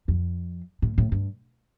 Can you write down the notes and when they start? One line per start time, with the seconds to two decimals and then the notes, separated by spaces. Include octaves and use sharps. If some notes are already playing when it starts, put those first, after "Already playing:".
0.08 F2
0.82 A2
0.98 A2
1.12 G2